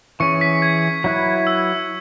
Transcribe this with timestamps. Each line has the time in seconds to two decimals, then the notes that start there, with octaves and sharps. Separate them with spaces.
0.20 E3 C#4 G#4 C#6 C#7
0.41 B6
0.62 G#6
1.04 F#3 E4 B4
1.47 E6